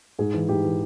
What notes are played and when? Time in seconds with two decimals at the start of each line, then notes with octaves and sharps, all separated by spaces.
0.19 G#2 G#4
0.34 E3
0.49 G#2 G4
0.65 E3